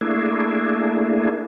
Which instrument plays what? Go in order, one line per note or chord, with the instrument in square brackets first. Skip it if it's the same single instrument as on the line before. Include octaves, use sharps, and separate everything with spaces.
[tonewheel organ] A3 A#3 D4 E4 G#4